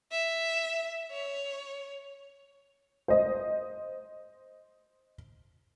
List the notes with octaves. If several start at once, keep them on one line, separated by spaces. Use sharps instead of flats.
E5
C#5
C5 D#5